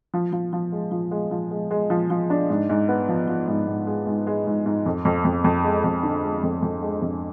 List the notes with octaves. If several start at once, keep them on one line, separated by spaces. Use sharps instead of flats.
F3
F3
F3
G#3
F3
G#3
F3
G#3
G#3
F3
F3
D4
G#2
G#2
B3
F3
F3
G#2
G#2
G#3
G#2
G#3
G#2
G#2
F2
F2
F2
F2
G#3
F2
D3
G#3
F2
F2
G#3
F2